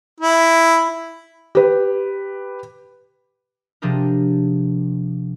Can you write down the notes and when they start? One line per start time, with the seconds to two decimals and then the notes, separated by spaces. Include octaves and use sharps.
0.20 E4
1.55 G4 B4
3.82 C3 F3 D4 G4 G#4 A#4